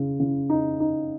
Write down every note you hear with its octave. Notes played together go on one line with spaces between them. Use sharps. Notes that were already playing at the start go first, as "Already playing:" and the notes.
Already playing: C#3
C#3
D#4
D#4